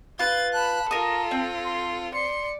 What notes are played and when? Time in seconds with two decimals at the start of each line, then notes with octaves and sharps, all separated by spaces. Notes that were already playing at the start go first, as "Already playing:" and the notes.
0.19 F4 B4 A6
0.53 A5 B5 F#6
0.91 F4 A4 A#4 D#6
1.31 C4
1.65 C6
2.13 D5 C6 C#7